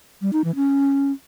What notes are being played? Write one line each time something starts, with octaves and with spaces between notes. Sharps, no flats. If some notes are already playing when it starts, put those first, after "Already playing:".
G3
D#4
E3
C#4